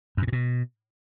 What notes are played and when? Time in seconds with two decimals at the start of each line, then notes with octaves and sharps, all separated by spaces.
0.17 F#2
0.22 A#2
0.27 A2
0.32 B2